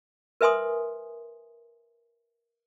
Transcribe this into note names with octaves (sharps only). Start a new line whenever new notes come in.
A#4 B4 E5 G#5 C6 D#6